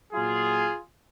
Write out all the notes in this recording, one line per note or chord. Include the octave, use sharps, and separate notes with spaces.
A#2 F#3 F4 G#4